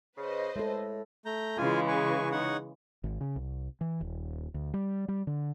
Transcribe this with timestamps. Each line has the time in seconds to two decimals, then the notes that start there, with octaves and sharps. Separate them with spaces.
0.17 C#3 B4 C5 D#5
0.56 A2 G#3 A4
1.26 A3 A#5 G6
1.57 C#3 E3 G#3 F4 G#5
1.88 B4 G#5 C#6
2.32 D#4 C#5 F#5
3.04 G#1
3.21 C#3
3.36 C2
3.81 E3
4.01 D#1
4.54 D2
4.74 G3
5.08 G3
5.27 D3